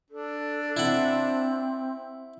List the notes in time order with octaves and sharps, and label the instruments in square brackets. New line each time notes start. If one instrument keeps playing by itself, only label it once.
[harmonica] D4 [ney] A4
[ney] C4 [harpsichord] E4 F#5